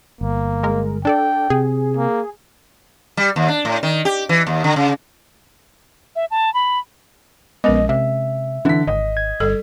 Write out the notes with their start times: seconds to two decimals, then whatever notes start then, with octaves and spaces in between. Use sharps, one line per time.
0.21 G1 A#3
0.63 G#3 A#4
1.05 D4 A4 D5 G5
1.50 C3 G#4
1.97 A#3
3.17 G3
3.36 D#2
3.48 D4
3.65 A2
3.83 D#3
4.05 G4
4.29 E3
4.47 D#2
4.64 D3
4.76 C#3
6.16 E5
6.31 A5
6.54 B5
7.64 A#1 G#3 B3 C#4 A#4 D#5
7.89 C3 E5
8.65 D3 E3 B6
8.87 G#1 D#5
9.17 G#6
9.40 G1 G3 A4